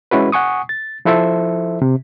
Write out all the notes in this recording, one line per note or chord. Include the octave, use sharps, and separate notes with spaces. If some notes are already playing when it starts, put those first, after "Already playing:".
G#3 C#4 E4 F#4 B4
F#5 G#5 C#6 D#6
A6
F3 E4 A4 C5 E5
C3